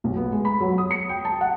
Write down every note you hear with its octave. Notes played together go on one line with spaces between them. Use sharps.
B1
B3
G#3
B5
F#3
D#6
C#7
G5
A5
F#5